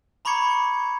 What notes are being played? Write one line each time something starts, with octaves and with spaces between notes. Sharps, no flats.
A#5 B5 C#6 D6 G#6 C#7